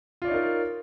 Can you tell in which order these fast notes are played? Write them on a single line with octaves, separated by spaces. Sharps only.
F4 D5 C#5 D#4 A#4